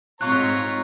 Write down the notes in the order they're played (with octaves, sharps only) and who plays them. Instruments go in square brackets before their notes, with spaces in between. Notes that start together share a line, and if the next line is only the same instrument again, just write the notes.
[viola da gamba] G#2 C4 F4 [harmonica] C#5 A#5 [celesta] C#6 F#6